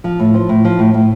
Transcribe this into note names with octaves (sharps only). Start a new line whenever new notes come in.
F3
A2
F3
A2
F3
A2
A2